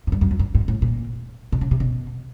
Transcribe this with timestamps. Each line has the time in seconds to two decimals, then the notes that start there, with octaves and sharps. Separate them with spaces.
0.07 G#2
0.12 G2
0.21 F#2
0.31 F2
0.39 G2
0.55 G#2
0.68 A2
0.82 A#2
1.52 B2
1.61 C#3
1.71 C3
1.80 B2